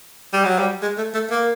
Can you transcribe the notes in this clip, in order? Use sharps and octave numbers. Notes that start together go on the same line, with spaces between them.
G3
F#3
G3
G#3
A3
A3
A#3